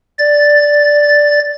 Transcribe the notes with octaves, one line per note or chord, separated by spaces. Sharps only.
D5 A6